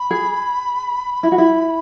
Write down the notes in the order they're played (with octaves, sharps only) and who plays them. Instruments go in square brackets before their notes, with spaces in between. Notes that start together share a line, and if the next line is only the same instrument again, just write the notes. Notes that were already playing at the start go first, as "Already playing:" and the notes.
Already playing: [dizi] B5
[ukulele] G#4
E4
F#4
E4